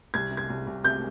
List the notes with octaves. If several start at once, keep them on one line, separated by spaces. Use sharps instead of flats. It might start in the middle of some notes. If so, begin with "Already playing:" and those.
C2 G#6
C3
G#6
C2
C2
C3 G6